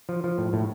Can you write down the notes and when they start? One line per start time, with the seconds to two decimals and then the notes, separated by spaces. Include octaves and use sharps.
0.09 F3
0.24 F3
0.38 A2
0.53 A2